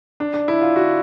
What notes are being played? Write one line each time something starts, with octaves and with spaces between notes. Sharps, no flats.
D4
D4
E4
F4
F#4